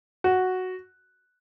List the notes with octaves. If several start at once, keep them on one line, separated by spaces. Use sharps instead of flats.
F#4